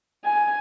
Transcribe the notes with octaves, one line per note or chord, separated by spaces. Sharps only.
G#5